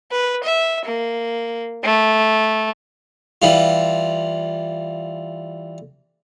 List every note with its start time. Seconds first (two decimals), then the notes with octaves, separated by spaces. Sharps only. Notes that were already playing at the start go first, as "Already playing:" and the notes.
0.11 B4
0.43 E5
0.85 A#3
1.83 A3
3.42 E3 G3 F4